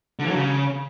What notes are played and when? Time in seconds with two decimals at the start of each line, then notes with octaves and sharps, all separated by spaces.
0.19 D3
0.25 E3
0.30 F#3
0.35 C#3